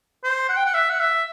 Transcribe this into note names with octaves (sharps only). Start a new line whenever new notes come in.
C5
F#5
G5
F#5
E5
F#5
E5